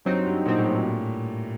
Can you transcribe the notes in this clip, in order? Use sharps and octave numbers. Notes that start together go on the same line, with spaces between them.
G2 F#3 C4 D#4
G2
A#2 F#3 C4 D#4
A2